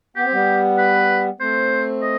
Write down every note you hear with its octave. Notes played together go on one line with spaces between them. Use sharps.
B3 G4
C4
G3 B3
B4
A3 C4 C5
D#5